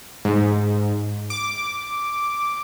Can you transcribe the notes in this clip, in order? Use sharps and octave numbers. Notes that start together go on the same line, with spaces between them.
G#2
D6